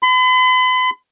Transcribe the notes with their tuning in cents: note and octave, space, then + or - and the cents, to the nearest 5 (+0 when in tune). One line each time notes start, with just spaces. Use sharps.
B5 +45